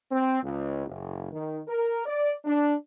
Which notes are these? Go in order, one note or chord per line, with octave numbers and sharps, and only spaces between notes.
C4
C#2
F#1
D#3
A#4
D5
D4